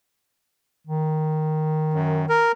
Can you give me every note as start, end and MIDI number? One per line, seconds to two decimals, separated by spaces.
0.87 2.45 51
1.94 2.26 42
2.29 2.52 70